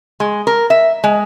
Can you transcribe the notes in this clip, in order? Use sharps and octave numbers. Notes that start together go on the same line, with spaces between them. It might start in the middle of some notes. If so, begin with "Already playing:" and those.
G#3
A#4
E5
G#3